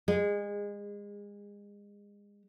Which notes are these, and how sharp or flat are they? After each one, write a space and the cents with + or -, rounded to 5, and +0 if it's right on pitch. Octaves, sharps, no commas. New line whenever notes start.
G#3 -30